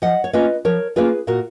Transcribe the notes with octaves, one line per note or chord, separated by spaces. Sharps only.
F3 D#5 F#5
C#5
A#3 C#4 F4 B4 D#5
F3 A#4 C#5
A#3 C#4 F4 G#4 B4
A#2 F#4 A#4